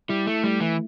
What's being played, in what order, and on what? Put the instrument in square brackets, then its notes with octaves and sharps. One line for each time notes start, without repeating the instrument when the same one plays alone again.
[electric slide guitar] G3 [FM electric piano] E4
[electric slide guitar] A3
[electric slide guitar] G3 [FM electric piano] A3
[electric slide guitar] E3